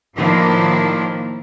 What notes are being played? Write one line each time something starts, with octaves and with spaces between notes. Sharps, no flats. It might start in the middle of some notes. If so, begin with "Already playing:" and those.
A2 D#3 F3 A#3 D4 E4